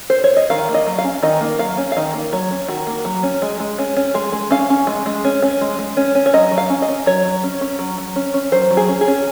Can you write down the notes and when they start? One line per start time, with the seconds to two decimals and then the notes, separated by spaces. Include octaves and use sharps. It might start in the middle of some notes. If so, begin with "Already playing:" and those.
0.10 C5
0.24 C#5
0.37 D#5
0.50 D#3 F5
0.69 A#3
0.74 D#5
0.87 F#3
0.98 F5
1.04 C#4
1.23 D#3 D#5
1.41 A#3
1.59 F#3 F5
1.77 C#4
1.92 F5
1.96 D#3 D#5
2.14 A#3
2.32 F#3 C#5
2.51 C#4
2.68 D#3 F#4
2.87 A#3
3.05 F#3
3.23 C#4
3.42 G#3
3.60 G#3
3.78 C#4
3.97 C#4
4.14 G#3 G#4
4.32 G#3
4.51 C#4 F5
4.70 C#4
4.87 G#3
5.06 G#3
5.25 C#4
5.42 C#4
5.61 G#3
5.79 G#3
5.97 C#4
6.15 C#4
6.26 C#5
6.33 F#3 D#5
6.51 F#3
6.58 F5
6.70 C#4
6.82 D#5
6.89 C#4
7.06 F#3 C#5
7.25 F#3
7.43 C#4
7.61 C#4
7.79 F#3
7.98 F#3
8.16 C#4
8.34 C#4
8.52 F#3 C5
8.71 F#3
8.77 G#4
8.88 C#4
9.01 G#4
9.07 C#4